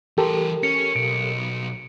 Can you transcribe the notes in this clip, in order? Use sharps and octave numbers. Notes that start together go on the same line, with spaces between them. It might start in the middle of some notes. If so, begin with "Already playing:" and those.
E3 G4 A4 A#4 C5
C#4 C#7
B1 D7